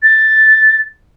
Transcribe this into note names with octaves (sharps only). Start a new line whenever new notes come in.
A6